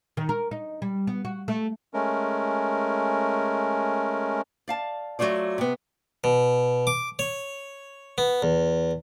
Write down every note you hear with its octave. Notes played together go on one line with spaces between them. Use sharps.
D#3
A#4
D#4
G3
B3
F#4
A3
G#3 A3 C#4 A#4
D5 F5 A5
F#3 G#3 A3 F4 D5
C3 B3
B2
D6
C#5
B3
E2